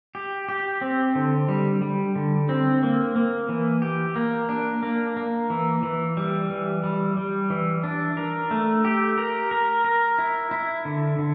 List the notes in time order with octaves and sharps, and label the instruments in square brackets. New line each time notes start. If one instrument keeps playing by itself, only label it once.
[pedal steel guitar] G4
G4
C4
D3
G3
G3
D3
C4
A#3
A#3
E3
G4
A#3
D4
A#3
A#3
E3
E3
G3
E3
G3
G3
E3
D4
A#4
A3
G4
A#4
A#4
A#4
E4
E4
D3
D3